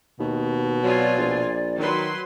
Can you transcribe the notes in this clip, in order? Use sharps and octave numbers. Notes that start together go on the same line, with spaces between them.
D#2 B2
F#3 C4 F4 D5 G#5
A#1
D#3 F#3 B4 C6